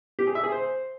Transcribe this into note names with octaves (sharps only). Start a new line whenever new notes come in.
G4
G#4
E5
G#4
C5